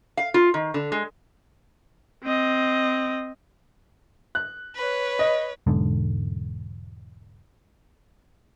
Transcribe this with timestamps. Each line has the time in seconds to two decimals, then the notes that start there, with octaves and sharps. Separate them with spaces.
0.17 F5
0.34 F4
0.54 D#3
0.74 D3
0.92 G#3
2.24 C4 D#5
4.35 F#6
4.75 B4 C#5
5.19 D#5
5.67 E1 G#2 D3